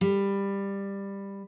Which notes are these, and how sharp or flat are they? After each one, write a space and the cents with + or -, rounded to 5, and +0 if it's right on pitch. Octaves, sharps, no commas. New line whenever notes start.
G3 +15